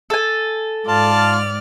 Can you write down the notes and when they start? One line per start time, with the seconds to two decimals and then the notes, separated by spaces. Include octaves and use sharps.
0.10 A4 G#5
0.88 G#2 F4 D5 A5 F6